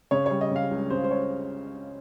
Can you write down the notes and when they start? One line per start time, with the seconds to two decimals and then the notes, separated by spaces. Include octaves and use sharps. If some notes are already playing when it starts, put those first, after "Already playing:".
0.11 C#3 C#5
0.26 G3 C#5
0.41 D#5
0.51 C#3 F5
0.71 C#2
0.90 C#3 C5
1.04 C5
1.11 C#5